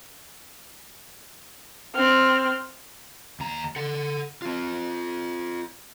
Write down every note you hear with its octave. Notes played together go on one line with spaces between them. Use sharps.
C4 F6
D#2 A#5
A4 F#5
C4 F4